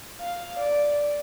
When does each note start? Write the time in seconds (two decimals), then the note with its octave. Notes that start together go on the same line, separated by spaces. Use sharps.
0.20 F5
0.59 D5